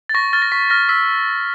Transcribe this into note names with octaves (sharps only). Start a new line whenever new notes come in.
A6
C#6 A#6
F6 A6
A#6
C#6 B6
F6 A#6
E6 B6